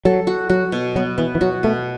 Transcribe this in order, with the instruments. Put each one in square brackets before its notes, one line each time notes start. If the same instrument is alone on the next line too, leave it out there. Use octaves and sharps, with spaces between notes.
[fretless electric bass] F#3 [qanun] A4
[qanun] F#4
[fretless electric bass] F#3 [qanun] F#4
[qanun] B2
[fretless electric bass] F#3 [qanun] B3
[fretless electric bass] E3 [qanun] B3
[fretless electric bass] E3
[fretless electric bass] F#3 [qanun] F#4
[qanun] B2 [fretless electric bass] A3